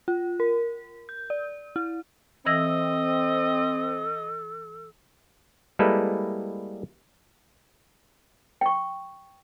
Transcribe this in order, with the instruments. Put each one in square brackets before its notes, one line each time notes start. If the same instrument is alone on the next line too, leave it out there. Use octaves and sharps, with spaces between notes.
[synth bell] F4
A#4
G6
D5
E4
[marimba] E3 E6 A#6 [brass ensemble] C4 [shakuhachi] A4 [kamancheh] D#5
[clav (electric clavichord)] G3 G#3 A#3 E4 A4 B4
[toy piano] G5 C#6